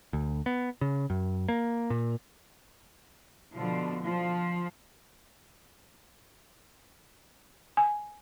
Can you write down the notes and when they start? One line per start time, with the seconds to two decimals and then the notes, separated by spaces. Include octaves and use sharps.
0.13 D2
0.46 B3
0.81 C#3
1.10 F#2
1.49 A#3
1.90 A#2
3.54 B2 D3 F3
4.03 F3
7.77 G#5